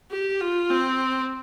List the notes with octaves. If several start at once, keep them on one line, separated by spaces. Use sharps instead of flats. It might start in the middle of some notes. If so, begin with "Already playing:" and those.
G4
F4
C4